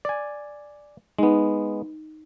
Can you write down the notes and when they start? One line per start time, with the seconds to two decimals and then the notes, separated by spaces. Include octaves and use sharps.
0.05 D5 G#5
1.19 G#3 B3 D#4